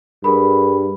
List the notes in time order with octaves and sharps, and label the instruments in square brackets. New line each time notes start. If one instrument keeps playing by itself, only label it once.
[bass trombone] G2 [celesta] G#4 A#4 B5